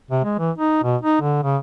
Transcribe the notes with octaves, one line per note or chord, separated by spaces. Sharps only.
C3
G#3
E3
D#4
B2
D#4
D3
C#3